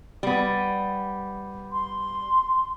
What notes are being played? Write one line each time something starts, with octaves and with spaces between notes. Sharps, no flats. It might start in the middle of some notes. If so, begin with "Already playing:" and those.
G3 B3
C6